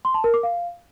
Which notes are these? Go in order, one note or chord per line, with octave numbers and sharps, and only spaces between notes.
C6
A5
A#4
D6
F5